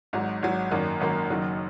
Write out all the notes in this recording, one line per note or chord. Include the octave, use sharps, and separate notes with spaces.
G#1 G#2 F#3
G#1 G#2 F#3
G#1 F#2 D#3 A#3
G#1 F#2 D#3 A#3
F#1 F#2 D#3 F#3